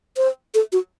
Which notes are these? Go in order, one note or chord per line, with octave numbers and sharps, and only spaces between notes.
C5
A4
F#4